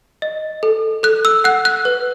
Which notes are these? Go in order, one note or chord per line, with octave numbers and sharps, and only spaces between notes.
D#5
A4
A4 F#6
E6
F#5 F#6
F#6
B4